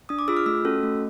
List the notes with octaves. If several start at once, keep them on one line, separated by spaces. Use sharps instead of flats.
D4 D#6
D6
F4 G#4 E6
F6
A3 E6
C#4 F#4 A4
A3